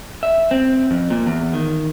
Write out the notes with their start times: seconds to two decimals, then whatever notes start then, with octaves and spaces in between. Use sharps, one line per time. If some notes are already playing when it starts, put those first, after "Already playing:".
0.23 E5
0.51 C4
0.91 F2
1.10 A#2
1.26 E2
1.54 D#3